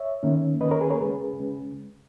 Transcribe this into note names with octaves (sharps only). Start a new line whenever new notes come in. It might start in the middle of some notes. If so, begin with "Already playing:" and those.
Already playing: C#5 E5
D#3 A#3 C#4
D#3 A#3 C#4 B4 D#5
A#4 C#5
G#4 B4
A#4 C#5
C#3 G#3 C#4 G#4 B4
C#3 G#3 C#4